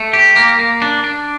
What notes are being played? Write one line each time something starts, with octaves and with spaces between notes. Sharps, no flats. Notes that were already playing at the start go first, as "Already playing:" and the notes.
Already playing: A3
G4
A#3
A#3
D4
D4